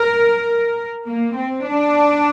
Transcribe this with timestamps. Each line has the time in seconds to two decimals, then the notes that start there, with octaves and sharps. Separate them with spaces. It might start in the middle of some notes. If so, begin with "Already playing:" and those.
Already playing: A#4
1.06 A#3
1.36 C4
1.66 D4